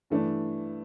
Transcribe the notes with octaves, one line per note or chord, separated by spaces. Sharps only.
G2 E3 A3 D4